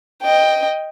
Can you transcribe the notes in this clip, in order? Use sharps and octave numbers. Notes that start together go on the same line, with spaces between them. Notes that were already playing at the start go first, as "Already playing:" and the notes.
D#5 G5